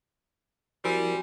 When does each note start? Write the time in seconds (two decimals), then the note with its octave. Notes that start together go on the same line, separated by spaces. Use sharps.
0.85 F3 G3 C4 E4 F#4 A#4 G#5